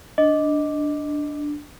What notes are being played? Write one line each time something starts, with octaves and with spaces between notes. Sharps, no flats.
D4 D#5